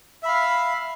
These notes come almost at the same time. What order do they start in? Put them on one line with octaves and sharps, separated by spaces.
E5 B5 F5